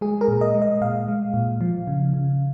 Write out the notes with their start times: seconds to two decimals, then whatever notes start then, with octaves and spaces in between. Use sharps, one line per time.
0.01 G#3 G#4
0.21 A#4
0.28 A#2
0.41 D#5
0.54 G#3
0.62 D#5
0.81 A#2 F5
1.08 G#3
1.34 A#2
1.61 F3
1.87 C#3
2.13 C#3